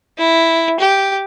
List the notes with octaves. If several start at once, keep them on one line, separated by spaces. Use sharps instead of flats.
E4
G4